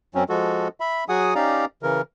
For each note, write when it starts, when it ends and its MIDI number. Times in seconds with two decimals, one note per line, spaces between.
0.15 0.24 42
0.15 0.24 54
0.15 0.24 60
0.15 0.24 61
0.29 0.68 53
0.29 0.68 56
0.29 0.68 66
0.29 0.68 69
0.80 1.04 76
0.80 1.04 83
1.09 1.34 54
1.09 1.34 66
1.09 1.34 68
1.09 1.34 78
1.09 1.34 80
1.09 1.34 87
1.35 1.65 61
1.35 1.65 63
1.35 1.65 67
1.35 1.65 74
1.35 1.65 77
1.35 1.65 82
1.83 2.02 49
1.83 2.02 52
1.83 2.02 70